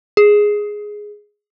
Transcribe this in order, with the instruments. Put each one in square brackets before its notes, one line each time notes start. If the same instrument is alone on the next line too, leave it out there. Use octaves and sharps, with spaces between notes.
[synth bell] G#4